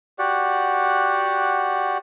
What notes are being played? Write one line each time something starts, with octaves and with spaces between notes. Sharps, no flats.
F#4 G4 D5 F#5